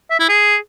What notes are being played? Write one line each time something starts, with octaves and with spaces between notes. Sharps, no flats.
E5
E4
G#4